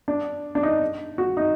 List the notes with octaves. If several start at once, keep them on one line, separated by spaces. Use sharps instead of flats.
D4
D4
D#4
F#4
D#4